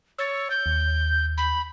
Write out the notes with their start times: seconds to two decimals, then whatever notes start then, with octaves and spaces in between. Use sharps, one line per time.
0.19 C#5 E6 A6
0.50 G6
0.66 D#2
1.37 B5